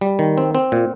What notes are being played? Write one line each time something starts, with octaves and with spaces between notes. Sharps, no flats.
G3
D#3
C4
C4
A#2